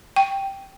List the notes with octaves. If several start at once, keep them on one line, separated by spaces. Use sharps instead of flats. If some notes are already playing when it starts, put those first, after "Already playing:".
G5